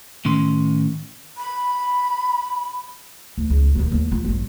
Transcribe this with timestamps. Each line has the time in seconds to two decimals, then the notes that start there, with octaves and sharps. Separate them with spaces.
0.25 A2 D#3 C#4 C6
1.38 B5
3.38 D2
3.50 C#2
3.75 D#1 D#3
3.92 D#2 E4
4.12 F4
4.25 A1 G2